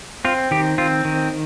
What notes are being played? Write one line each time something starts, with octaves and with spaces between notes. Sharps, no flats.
C4 F4
D#3 G4
C4 F4
D#3